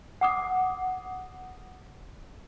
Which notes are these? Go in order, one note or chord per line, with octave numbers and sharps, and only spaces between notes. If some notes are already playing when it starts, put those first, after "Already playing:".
F#5 D6 D#6